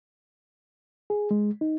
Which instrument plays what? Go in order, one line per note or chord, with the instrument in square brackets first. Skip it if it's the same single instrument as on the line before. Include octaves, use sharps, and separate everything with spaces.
[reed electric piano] G#4
G#3
D#4